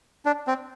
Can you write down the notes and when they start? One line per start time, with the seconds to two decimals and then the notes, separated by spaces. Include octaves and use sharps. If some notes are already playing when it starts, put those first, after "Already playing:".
0.26 D4
0.47 C4